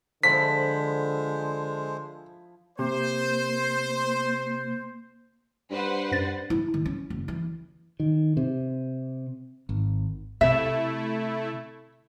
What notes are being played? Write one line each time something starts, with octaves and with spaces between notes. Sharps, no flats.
D3 F3 G#3 E4 C5 B5 B6
C3 A#3 C5
G2 B4 C5 F#5
F#2 A6
E4
D#3
C#4
F#1
E3
D#3
C3
G#1
C3 A3 E4 E5